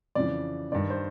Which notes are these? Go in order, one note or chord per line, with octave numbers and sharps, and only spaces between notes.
F2 C#3 E3 D5
G2 D#3 D5
C5